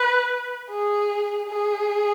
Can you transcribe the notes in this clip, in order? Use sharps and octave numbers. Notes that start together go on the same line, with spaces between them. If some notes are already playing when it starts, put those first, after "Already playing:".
Already playing: B4
G#4
G#4